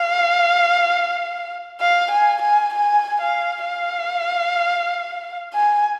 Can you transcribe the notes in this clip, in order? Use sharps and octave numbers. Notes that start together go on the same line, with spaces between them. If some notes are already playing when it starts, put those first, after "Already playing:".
Already playing: F5
F5
G#5
G#5
G#5
F5
F5
G#5